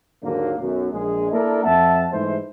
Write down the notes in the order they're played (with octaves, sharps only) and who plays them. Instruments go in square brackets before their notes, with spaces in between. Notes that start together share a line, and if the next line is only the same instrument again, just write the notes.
[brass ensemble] D#2 G#2 D3 F#3 A#3
B1 F#2
A#1 G#3 G#4
A#3 D4 E4 A4 A#4
F2 E5 F#5 A5
G#2 E3 G#3 A3 C5